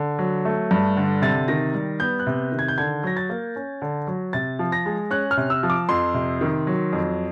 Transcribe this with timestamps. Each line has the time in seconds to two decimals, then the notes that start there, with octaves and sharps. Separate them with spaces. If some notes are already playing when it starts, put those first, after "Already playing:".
Already playing: D3
0.19 F#3
0.45 A3
0.71 G2
0.97 D3
1.22 C3 A6
1.48 D#3 A#6
1.74 G3
2.00 B3 G6
2.19 F#6
2.27 C3
2.52 D#3
2.59 G#6
2.68 G6
2.78 D3 G#6
3.04 F#3 A#6
3.17 A6
3.30 A#3
3.56 C#4
3.82 D3
4.07 F#3
4.33 C3 A6
4.59 F3
4.72 A#6
4.86 G#3
5.11 C#4 F#6
5.31 F6
5.37 C3
5.50 E6
5.63 F3
5.70 D6
5.89 F2 C6
6.14 C3
6.41 D#3
6.67 F#3
6.93 F2